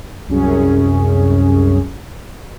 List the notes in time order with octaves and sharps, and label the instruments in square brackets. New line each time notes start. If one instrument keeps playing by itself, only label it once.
[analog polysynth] C2 F#2 C#4 G#4